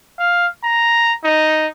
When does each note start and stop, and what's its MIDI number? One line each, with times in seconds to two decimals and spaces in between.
0.19 0.46 77
0.64 1.13 82
1.24 1.67 63